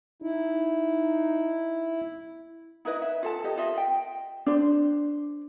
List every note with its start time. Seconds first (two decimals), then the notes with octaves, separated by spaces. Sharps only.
0.22 D#4 E4
2.85 D#4 E4 B4 D#5
3.02 E5
3.23 F4 A4 A5
3.44 G4 A4 D#5
3.57 F4 D#5 E5
3.78 G5
4.46 D4 C5